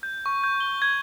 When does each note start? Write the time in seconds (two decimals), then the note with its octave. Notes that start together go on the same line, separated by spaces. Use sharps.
0.03 G6
0.26 C#6
0.44 G6
0.60 G7
0.82 G#6